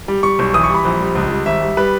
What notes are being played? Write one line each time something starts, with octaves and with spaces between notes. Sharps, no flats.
G3
G3 C#6
B1
E3 D#6
C#6
G3 B5
A#1
G3
C#2
G3
G#1 E5
G3
G3 B4